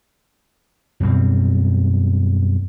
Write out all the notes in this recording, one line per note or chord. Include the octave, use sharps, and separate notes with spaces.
F#2 B2 G3 C4